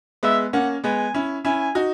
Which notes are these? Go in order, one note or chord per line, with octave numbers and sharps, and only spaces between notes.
G#3 B3 E5
A#3 C#4 F#5
G#3 B3 G#5
C#4 E4
C#4 E4 G#5
D#4 F#4